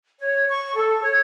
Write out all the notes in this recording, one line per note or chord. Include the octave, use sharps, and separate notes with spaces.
C#5
C#6
A4
C#5